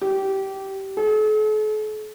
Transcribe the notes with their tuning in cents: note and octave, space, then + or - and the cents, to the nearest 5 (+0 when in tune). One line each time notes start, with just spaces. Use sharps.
G4 -20
A4 -45